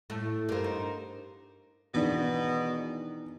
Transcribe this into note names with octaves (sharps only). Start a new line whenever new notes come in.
A2 A3
G2 F4 G4 A#4 C5
D#4
E2 B2 D#3 D4